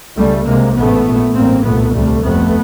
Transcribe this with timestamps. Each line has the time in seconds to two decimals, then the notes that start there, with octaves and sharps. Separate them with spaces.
0.17 C#2 C#3 G3 A3
0.47 C2 C3 G#3 A#3
0.76 A1 G#2 A3 B3
1.06 A#1 A#2
1.35 A1 G2 A#3 C4
1.65 C2 A#2 A3 B3
1.94 D2 C3 G3 A3
2.24 G1 F2 C3 A3 B3